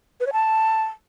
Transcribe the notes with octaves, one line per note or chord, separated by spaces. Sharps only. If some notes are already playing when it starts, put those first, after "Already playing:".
B4
C#5
A5